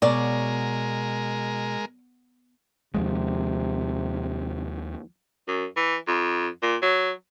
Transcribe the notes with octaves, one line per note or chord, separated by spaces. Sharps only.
B2 F#3 G#3 A#4 D5
D#2 C3 F3 G#3
F#2
E3
F2
A#2
F#3